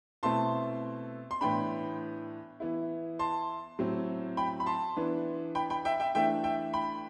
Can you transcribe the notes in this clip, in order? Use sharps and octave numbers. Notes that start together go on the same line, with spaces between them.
B2 A3 C4 E4 A5 C6
C6
A2 E3 B3 D4 G5 B5
E3 B3 E4
A5 C6
A2 F#3 C4
G5 B5
B5
A5 C6
E3 B3 D4
G5 B5
G5 B5
E5 G5
E5 G5
E3 A3 D4 E5 G5
E5 G5
G5 B5